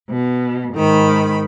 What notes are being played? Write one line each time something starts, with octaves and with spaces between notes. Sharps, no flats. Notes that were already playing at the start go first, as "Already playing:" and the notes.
B2
G#2 D#3 B5